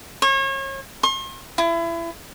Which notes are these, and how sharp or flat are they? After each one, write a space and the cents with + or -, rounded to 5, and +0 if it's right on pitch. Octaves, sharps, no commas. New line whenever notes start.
C#5 -35
C6 +45
E4 +30